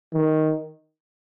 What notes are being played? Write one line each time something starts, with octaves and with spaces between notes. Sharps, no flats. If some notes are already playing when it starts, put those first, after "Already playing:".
D#3